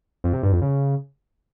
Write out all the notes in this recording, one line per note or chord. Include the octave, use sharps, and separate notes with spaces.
F2
C3
G2
F2
C#3